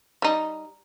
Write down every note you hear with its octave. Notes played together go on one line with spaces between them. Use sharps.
G3 D#4